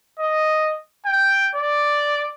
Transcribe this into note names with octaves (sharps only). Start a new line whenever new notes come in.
D#5
G5
D5